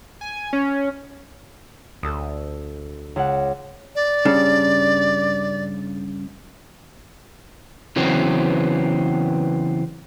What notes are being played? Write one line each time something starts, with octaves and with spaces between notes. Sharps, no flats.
G#5
C#4
D2 A4 D#6
C#2 F#5
D5
G2 C#3
C#3 E3 F#3 B3 C4